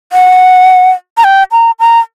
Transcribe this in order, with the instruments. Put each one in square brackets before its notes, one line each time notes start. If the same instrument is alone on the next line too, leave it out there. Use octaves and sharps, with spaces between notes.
[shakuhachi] F#5
A#5
G5
A#5
A#5